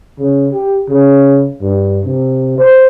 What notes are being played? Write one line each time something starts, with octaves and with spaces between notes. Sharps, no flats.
C#3
G4
C#3
G2
C3
C5